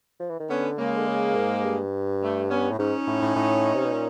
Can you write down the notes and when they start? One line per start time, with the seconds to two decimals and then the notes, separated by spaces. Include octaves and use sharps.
0.20 F3
0.30 E3
0.40 D#3
0.49 D3 B3 C#4
0.78 C#3 G#3 A#3
0.97 D3
1.07 C#3
1.36 G#2
1.64 G2
2.22 G3 A3
2.50 B3 C#4
2.72 A2
2.79 G#2 C#4 D#4
3.07 A2
3.22 A2
3.36 A2
3.75 C3
3.85 B2
3.93 A#2